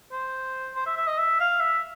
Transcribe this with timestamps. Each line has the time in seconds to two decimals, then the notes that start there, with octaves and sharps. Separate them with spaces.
0.12 C5
0.75 C5
0.87 E5
0.97 E5
1.07 D#5
1.18 E5
1.40 F5
1.60 E5